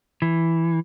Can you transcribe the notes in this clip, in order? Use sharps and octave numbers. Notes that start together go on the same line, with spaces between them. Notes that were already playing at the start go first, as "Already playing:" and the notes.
E3